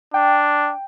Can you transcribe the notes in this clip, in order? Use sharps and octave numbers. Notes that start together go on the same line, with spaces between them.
D4 G5